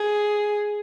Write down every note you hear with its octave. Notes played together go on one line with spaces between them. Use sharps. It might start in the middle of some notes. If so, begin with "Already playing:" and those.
Already playing: G#4